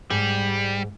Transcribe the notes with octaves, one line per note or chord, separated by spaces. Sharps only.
G#2 G3